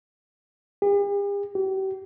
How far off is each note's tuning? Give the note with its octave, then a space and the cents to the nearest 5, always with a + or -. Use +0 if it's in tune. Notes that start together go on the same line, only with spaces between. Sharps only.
G4 +45
G4 -40